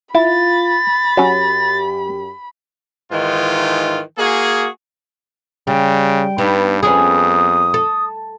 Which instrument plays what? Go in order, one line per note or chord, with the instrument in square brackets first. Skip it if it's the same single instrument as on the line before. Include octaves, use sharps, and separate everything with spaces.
[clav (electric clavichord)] E4 [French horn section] F4 [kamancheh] B5 [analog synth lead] A6
[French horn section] F#2 G4 [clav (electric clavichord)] F#3 C#4
[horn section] G#2 D#3 E3 F4
A#3 F#4 G#4
[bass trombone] C#3 [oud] G3 [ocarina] G5
[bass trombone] G2 [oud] B3 D#4
[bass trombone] F2 [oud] B3 C#4 G#4 [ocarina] D#6
[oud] A4